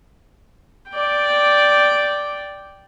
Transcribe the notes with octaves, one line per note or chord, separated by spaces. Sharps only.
D5 G5